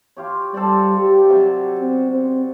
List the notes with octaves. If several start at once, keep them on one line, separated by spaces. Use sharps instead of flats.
F4 G4 C#5
G3 A4 C5 D5
G4
C3 F#3
C4
C4